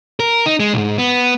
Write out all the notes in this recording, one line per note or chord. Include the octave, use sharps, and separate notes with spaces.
A#4
D#4
G#3
B1 G#2
B3